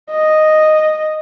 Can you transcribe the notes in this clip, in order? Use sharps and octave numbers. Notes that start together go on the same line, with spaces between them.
D#5